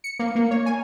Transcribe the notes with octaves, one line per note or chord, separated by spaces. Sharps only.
C#7
A#3
A#3
C#5
G#5